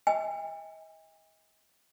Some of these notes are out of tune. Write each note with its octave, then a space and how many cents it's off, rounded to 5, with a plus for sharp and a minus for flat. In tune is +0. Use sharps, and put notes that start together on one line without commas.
D#5 +45 G#5 -45